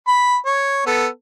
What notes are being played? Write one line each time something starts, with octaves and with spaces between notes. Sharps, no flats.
B5
C#5
B3 A4